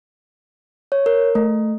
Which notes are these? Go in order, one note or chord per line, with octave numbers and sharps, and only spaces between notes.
C#5
A#4
A3